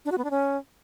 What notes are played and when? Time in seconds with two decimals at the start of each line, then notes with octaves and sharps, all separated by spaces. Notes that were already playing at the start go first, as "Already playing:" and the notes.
0.05 D4
0.11 F#4
0.18 B3
0.24 D4
0.31 C#4